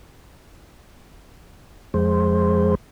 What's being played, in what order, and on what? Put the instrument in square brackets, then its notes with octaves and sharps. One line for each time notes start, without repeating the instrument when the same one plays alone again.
[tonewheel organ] F2 G#3 C5